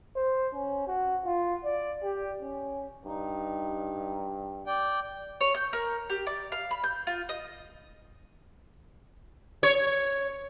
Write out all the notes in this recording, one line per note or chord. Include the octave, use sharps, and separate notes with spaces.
C5
C#4
F#4
F4
D5
G4
C#4
G2 D#4
D5 G5
C#5
G6
A#4
G4
D5
F5
B5
G6
F4
D#5
C#5